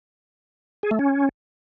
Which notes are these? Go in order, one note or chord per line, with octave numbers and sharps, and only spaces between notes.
G#4
A3
C#4